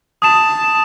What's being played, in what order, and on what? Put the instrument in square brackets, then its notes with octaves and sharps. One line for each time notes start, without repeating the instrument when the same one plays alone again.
[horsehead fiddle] A5 [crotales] D#6 E7